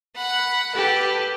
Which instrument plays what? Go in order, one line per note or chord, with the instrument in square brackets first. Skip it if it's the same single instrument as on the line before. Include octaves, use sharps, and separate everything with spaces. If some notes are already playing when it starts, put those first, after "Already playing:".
[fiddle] F#5 B5
[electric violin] G4 B4 [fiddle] A4